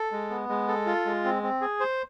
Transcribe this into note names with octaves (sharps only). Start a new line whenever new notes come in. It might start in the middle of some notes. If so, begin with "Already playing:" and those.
Already playing: A4
G#3
B3
G#3
A4
F4
G#3
C4
C4
G#4
C5